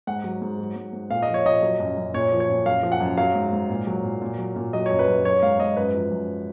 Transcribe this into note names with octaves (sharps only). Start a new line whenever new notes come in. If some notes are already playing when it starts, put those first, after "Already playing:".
G#2 F#5
F#3
G#2
F#3
G#2
G#2
A#2 F5
D#5
F3
C#5
A#2 D#5
F#3
F#2
F#2
A#2 C#5
F3
C#5
A#2
F#2 F5
F3
F#5
F#2
F#3 F5
G#2
G#2
A#2
F#3
A#2
A#2
F#3
A#2
F#3 D#5
F#2 C#5
B4
F#2
F#3 C#5
G#2 F5
G#2 D#5
F#2 B4
F3
F#2